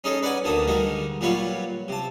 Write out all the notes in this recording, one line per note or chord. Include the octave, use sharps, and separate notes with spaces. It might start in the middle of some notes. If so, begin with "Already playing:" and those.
C#4 D#4 G#4 A4 D#5
B4 D5 F#5 G#5
D2 D3 D#3 A#3 A5 D#6
D3 D#3 G3 G#3 D#4 A#4
A#2 F#3 G3 F4 B4 C#5
C3 A5